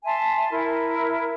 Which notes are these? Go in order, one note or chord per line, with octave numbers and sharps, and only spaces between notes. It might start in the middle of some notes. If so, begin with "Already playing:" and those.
E5 G#5 A5 C6
E4 A#4